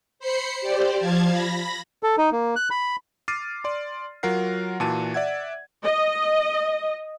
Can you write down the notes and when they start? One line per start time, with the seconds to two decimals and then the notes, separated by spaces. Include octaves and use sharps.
0.19 C5 B5 C7 C#7
0.61 G4 C5 D5
0.99 F3 F5 A5 G#6
1.30 B5 A#6
2.03 A4
2.18 D#4
2.32 A#3
2.56 F#6
2.71 B5
3.28 D6 F6 A6 C7 D#7
3.64 D5 C6
4.23 F#3 F4 A#4 F#5 C7
4.80 A#2 E3 F#4 A5 D#7
5.14 D5 E5 F#5 G#6
5.84 D#5